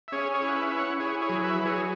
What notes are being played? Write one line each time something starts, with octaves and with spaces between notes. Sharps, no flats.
E5
C#4 G#4 C#5
G#4 C#5
E4
F#5
B4 E5
E4 E5
C#5 F#5
E4 G#4 C#5
G#4 C#5
F#3
B4 E5
F#3 B4
G#4 C#5